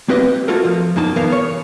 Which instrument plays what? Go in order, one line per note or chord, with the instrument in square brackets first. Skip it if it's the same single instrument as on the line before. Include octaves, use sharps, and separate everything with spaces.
[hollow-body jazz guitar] A#3 C4 G4 B4 D#5
A3 A#3 F4 F#4 A4 A#4
F3
F#2 A#3 D#4 A5
E3 B3 A#4 F5
C#5